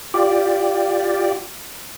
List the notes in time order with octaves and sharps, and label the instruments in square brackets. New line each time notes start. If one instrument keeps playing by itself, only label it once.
[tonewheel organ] F4 G4 D5